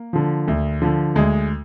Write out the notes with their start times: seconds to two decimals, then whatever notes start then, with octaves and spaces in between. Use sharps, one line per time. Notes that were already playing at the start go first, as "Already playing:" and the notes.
Already playing: A#3
0.13 D3 F3
0.48 D2
0.82 D3 F3
1.15 D2 G#3